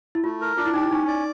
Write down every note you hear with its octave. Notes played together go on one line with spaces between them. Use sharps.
E4
A3 F4
A#4
D4 F4
E4
D#4 G4
E4
C#4 D#4
D5